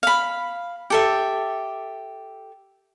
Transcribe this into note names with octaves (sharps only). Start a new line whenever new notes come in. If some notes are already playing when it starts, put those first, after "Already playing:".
F5 B5
G4 A4 E5